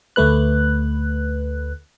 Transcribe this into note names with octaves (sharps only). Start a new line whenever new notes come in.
D2 A3 B4 F#6